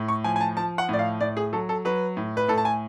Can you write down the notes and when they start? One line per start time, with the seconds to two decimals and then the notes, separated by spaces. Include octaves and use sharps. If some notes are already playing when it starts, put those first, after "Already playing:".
Already playing: A2
0.08 C#6
0.24 F3 G#5
0.36 G#5
0.41 A5
0.57 F3 A5
0.78 F#5
0.89 A2 D5
0.99 F5
1.21 A2 D5
1.37 G#4
1.53 F#3 A4
1.69 A4
1.85 F#3 B4
2.17 A2
2.37 B4
2.48 A2 A4
2.58 A5
2.65 G#5